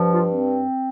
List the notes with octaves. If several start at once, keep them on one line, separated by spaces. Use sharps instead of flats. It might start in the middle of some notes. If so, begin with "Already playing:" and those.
Already playing: G2 F3
F4
C4